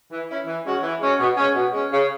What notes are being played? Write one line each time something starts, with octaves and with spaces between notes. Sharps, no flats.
E3
C#4 E4
E3
G#3 C#4 F#4
E3
G#3 C#4 F#4
B2
G#3 C#4
B2
G#3 C#4
C#3